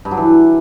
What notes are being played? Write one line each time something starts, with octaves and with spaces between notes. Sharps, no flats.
G2
F#3
E3